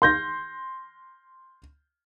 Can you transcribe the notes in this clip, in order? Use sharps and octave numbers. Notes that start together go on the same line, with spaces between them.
C6 G6 A#6